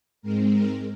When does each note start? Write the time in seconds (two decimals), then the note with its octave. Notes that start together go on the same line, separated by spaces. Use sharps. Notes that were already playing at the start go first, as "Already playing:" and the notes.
0.22 G#2 G#3 C4 A#4
0.51 A#4